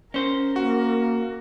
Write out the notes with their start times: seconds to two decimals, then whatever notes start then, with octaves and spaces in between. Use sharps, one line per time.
0.14 C#4 A#4 C5
0.56 A#3 F#4